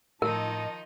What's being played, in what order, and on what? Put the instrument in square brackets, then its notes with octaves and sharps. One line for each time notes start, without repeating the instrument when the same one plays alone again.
[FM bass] A2 [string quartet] D#3 F3 D#4 [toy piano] A#4 [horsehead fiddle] D#5 A5